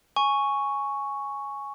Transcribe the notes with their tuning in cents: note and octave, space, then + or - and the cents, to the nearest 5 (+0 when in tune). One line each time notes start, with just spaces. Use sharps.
G#5 +0 C#6 +0